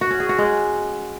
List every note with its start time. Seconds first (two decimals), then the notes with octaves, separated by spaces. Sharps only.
0.01 F#4
0.11 C#4
0.20 G#4
0.29 F#4
0.38 G#3